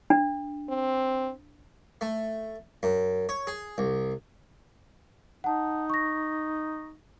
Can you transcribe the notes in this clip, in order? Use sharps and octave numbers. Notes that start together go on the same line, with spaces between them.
D4
C4
A3
F#2
C#5
G#4
C2
D#4 F#5 A5
C#6 A#6